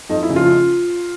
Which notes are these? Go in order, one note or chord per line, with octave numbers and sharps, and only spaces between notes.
F2 D#4
E4
C#3 F3
F4